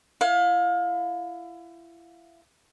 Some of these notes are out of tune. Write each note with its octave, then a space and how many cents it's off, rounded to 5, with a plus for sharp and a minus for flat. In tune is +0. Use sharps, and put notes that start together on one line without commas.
E4 +35 F5 +30